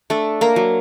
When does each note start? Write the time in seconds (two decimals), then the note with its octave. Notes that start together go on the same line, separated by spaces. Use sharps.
0.10 A3 D4 A4
0.41 A#3 A#4
0.56 F#3